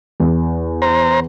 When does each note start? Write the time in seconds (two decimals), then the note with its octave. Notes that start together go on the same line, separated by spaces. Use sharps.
0.20 E2
0.82 C5 A#5